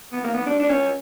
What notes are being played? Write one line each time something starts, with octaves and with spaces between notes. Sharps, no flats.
B3
A#3
B3
D4
D4
C#4